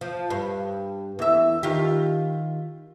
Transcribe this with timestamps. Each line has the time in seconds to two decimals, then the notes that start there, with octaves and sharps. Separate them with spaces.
0.01 F3
0.30 G2
1.19 E2 E5
1.63 D#3 F4 G4